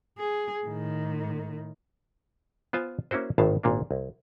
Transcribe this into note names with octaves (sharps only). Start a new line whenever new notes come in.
G#4
A2 D#3
B3 F4 C5 F5 G#5
A#3 C#4 E4 F#4 C5
G#1 A2 D#3 E5 F5 A5
G#1 A#2 A#3 D4
C2